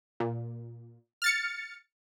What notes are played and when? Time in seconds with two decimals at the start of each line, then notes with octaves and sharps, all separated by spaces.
0.20 A#2
1.22 F6 A6 C#7